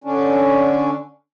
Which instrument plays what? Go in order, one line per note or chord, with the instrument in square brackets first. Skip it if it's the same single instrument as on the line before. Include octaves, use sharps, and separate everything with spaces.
[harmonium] D3 C#4 D4